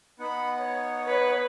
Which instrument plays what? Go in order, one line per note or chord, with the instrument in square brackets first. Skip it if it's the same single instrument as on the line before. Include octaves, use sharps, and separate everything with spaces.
[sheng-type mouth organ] B3 D#4 F#5 [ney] B5
[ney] C#5
[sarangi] B4